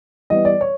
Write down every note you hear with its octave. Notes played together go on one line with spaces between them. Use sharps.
E3 G3 B3 D#5
D5
C#5